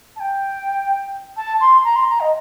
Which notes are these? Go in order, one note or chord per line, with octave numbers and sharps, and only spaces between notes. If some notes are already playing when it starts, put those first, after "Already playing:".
A5
G5
A5
C6
A#5
C6
A#5
D#5